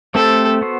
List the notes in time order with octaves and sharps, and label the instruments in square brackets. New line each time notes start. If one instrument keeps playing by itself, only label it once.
[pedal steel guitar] A3 C4 G4 C5 [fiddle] A4
[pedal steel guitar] B3 F#4 C5